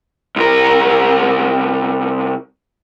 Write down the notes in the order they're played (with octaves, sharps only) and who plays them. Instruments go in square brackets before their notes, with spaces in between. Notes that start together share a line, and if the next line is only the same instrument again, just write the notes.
[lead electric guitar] C2 A#4